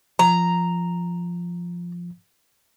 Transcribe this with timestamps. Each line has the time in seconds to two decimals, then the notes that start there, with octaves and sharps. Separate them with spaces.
0.19 F3 A#5